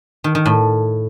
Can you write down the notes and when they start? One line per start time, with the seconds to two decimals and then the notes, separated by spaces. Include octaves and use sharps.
0.24 D#3
0.35 D#3
0.46 A2